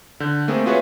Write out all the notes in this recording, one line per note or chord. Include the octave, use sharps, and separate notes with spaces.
D3 G6
A3 A#3 C4 G#4
F4 F#4 G#4 B4 C#5 E5